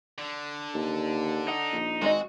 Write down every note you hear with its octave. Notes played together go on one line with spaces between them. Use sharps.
D3
D#2
D#4 F#5
A#1
G#1 G#3 C4 F#4 D#5